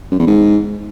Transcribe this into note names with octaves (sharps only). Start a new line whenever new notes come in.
F#2
E2
G#2